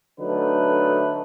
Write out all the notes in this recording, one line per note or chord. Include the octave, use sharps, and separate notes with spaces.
D3 F#3 A3 D#4 B4